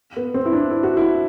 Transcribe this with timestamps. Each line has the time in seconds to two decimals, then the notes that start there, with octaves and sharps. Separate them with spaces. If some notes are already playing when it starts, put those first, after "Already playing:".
0.16 B3
0.34 C4
0.46 E4
0.53 D4
0.71 E4
0.83 F#4
0.97 E4